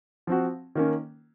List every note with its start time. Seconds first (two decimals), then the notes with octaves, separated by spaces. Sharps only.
0.27 F3 C4 F#4
0.75 D#3 A#3 C#4